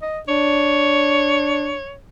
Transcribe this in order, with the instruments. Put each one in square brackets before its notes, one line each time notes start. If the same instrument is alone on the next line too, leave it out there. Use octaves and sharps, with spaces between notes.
[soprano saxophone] D#5
[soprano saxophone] D4 [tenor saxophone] C#5